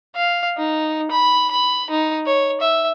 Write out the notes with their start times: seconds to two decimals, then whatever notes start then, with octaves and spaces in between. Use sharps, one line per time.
0.15 F5
0.57 D#4
1.11 B5
1.51 B5
1.90 D#4
2.26 C#5
2.61 E5